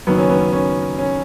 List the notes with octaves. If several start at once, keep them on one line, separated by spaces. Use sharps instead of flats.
F#1 F#2 D#3 F#3 B3
C#4
B3
C#4
C#4